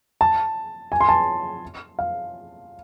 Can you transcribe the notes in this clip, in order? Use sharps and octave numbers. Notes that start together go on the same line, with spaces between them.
A5
G#5
C6
A5
F5